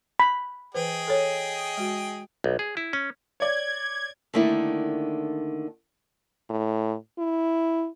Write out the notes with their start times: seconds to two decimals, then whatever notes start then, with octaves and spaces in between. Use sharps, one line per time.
0.20 B5
0.74 E3 G#4 B4 C5 D#5 G5
1.08 A4 C#5
1.77 G#3 F#4
2.44 B1
2.59 G#4
2.77 E4
2.93 C#4
3.40 C#5 D5 G#6
4.34 D3 D#3 A3 A#3 D#4 E4
6.50 A2
7.19 E4